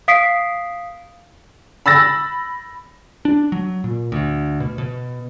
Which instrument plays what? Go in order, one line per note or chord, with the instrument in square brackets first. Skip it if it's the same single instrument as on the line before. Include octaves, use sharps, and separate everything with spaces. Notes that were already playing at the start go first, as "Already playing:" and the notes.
[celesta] F5 D#6 B6 C7 D7
[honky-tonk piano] B5 E6 A6 A#6
[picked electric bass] D4
F#3
A#2
D2
B2
B2